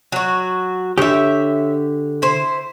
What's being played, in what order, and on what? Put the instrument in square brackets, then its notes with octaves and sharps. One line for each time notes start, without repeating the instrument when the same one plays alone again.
[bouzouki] F#3 F#4
[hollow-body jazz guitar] D3 G4 [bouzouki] C#5 E5
[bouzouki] E4 C5